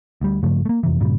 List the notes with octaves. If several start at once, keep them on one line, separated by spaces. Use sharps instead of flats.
D2 G3
G2 C#3 F3 A3
A3 A#3
F2 C3 E3
G2 A#2 C#3 G3